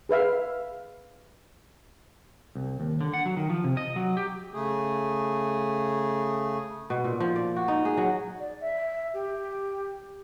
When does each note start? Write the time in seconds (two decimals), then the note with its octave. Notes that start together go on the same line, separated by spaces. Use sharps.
0.09 G#4 B4 E5 F5
2.55 C2
2.80 D#2
3.01 D3
3.14 F#5
3.26 F#3
3.37 D#3
3.50 F3
3.64 C3
3.77 D#5
3.96 F#3
4.17 G4
4.53 C#3 A3 G#4
6.90 B2
7.04 A#2
7.20 F3
7.36 D5
7.56 F#4
7.68 D#4
7.85 G#4
7.97 F#3
8.39 D5
8.61 E5
9.14 G4